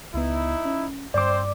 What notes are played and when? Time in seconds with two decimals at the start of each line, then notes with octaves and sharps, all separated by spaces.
0.14 C#2 B3 D#4 E4
0.65 C#4
1.14 G2 C4 C5 D5 D6